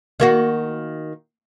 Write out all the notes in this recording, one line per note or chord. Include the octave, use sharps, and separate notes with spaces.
D#3 A#3 F#4